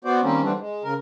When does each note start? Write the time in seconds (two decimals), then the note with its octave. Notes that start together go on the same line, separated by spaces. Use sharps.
0.05 B3 F#4 C5 D5
0.23 D#3 G3 A#3 C4 C#4
0.42 D3 E3 G3 C4 D4
0.60 G#3
0.84 C#3 A#4